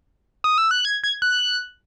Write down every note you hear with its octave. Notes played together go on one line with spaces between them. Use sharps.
D#6
E6
F#6
G#6
G#6
F#6